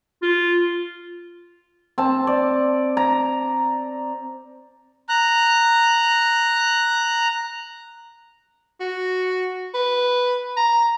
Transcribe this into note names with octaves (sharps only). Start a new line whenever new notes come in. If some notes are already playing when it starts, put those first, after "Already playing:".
F4
C4 A5
D5
A#5
A#5 F#6
F#4
B4
A#5